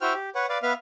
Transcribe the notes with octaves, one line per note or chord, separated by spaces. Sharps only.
E4 F#4 C5 G5 F6
G4
B4 C#5 F#5
B4 D5 F5
B3 B4 E5 F5 F6